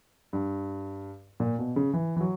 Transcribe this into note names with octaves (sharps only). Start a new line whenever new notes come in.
G2
A#2
B2
C#3
E3
E3
F#3